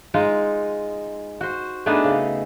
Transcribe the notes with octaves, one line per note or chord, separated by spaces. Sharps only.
G#3 D#4 F4
F#4 C5
A3 B3 D4 D#4 G#4 B4
C#3